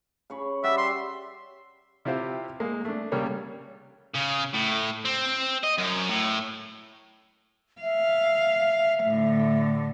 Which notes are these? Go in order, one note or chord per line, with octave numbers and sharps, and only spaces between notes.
C#3 C#5 B5
G3 D5 E5 F#5
C6
C3 E4 F4 G4 C5
G#3 A#3
A3 D4
C2 C#3 G3 A#3 C#5
C#3
A2
C4
D#5
F#2
A2
E5 F5
A2 D3